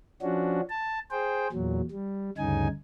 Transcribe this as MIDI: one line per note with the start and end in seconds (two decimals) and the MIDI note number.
0.22 0.61 53
0.22 0.61 61
0.22 0.61 62
0.22 0.61 66
0.70 0.99 81
1.11 1.48 68
1.11 1.48 72
1.11 1.48 79
1.52 1.81 40
1.52 1.81 46
1.52 1.81 54
1.91 2.30 55
2.38 2.68 38
2.38 2.68 43
2.38 2.68 49
2.38 2.68 63
2.38 2.68 80